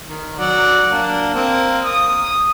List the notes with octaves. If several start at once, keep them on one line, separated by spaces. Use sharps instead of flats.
D#3
F#3 D5 F#5
A#3 D4
A#3 C4
D#6